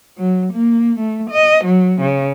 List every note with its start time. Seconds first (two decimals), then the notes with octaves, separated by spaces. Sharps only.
0.18 F#3
0.54 A#3
1.00 A3
1.31 D#5
1.65 F#3
2.01 C#3